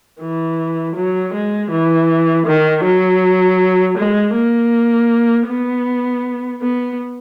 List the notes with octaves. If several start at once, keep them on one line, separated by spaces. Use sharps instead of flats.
E3
F#3
G#3
E3
D#3
F#3
G#3
A#3
B3
B3